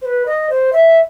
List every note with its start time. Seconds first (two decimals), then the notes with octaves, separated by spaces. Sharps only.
0.02 C5
0.05 B4
0.26 D#5
0.50 C5
0.73 E5